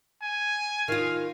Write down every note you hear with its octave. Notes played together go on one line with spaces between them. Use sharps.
G#5
D#3 F4 F5